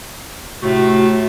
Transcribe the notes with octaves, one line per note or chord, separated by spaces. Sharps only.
A2 C3 A3 F#4